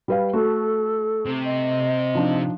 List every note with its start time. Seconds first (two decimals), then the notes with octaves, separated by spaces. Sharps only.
0.08 G3 B4 F5
0.33 A3 F#4 A4
1.26 C3
1.45 D#5
2.15 F3 D4 D#4